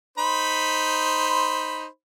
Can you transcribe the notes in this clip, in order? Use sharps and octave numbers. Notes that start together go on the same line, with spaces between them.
D#4 C5 B5